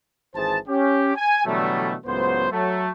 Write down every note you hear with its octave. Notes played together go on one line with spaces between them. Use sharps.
G#1 E3 G#4 C5 A5
C#4 G4
G#5
B2 D3 E3 F#3 G3 A3
C#2 A2 F#3 B3 C5
F#3 A3